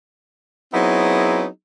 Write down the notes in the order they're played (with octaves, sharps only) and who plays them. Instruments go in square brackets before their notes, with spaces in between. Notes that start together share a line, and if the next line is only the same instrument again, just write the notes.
[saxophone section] F#3 B3 C4 D#4 E4 G#4